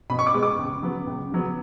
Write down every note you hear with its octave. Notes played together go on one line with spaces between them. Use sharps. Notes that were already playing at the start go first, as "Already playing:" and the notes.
B2 B5
C#6
D6
G#3 B3
D6
C#2
C#3 F#3 B3
C#2
C#3 F#3 B3